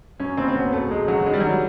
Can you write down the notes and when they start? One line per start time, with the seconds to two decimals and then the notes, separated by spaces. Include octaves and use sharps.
0.20 F#2 C#4
0.37 F#1 C4
0.48 C4
0.55 F#1 B3
0.73 E1 A3
0.90 E1 G#3
1.08 C#3 F#3
1.26 D#3 G#3
1.33 G3
1.40 F#3
1.44 D#3 G3